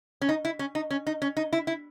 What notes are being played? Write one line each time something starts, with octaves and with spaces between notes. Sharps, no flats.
C#4
D#4
E4
C#4
D#4
C#4
D#4
C#4
D#4
E4
E4